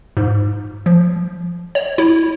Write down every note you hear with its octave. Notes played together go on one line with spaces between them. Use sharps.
G#2
F3
C#5
E4